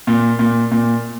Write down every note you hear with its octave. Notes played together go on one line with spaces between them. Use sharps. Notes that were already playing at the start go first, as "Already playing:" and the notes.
A#2
A#2
A#2